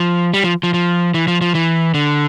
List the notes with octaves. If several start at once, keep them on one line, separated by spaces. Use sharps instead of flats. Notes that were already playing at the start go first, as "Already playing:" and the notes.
Already playing: F3
G3
F3
F3
F3
E3
F3
F3
E3
D3